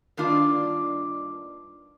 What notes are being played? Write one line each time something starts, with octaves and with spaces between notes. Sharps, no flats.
G2 D#3 A#3 D4 F4